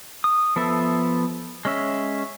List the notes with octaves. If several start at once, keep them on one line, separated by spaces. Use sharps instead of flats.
D#6
F3 B3 A4 E5
G#3 C#4 E5